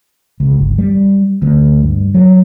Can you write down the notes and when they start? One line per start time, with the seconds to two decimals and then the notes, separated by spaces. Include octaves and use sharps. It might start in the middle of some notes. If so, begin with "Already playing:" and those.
0.40 C#2
0.59 G1
0.78 G3
1.42 D2
1.83 G2
2.14 F#3